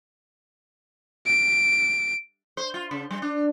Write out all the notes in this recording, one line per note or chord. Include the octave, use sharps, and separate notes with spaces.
D7
C5
F4
C#3
G3
D4